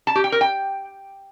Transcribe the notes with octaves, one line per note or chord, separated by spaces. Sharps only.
A5
G4
G5
A#4
G5